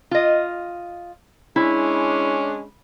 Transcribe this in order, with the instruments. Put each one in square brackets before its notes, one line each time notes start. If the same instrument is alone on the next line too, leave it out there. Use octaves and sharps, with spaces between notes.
[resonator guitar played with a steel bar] F4 D#5
[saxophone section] G#3 C#4 D4 [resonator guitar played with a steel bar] E4